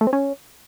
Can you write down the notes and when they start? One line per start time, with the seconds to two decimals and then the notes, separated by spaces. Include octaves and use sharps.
0.01 A3
0.07 C4
0.13 C#4